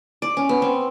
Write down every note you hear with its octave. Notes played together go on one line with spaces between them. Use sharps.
D5
C#4
B3
C4